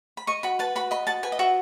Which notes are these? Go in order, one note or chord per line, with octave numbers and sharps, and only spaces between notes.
B5
D#5 C#6
F#4 B5
B4 A5
F#4 B5
D#5 B5
F#4 A5
B4 G#5
D#5
F#4 E5